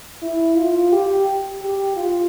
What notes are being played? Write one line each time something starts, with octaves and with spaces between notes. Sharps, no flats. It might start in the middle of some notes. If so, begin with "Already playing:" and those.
E4
F4
G4
G4
F4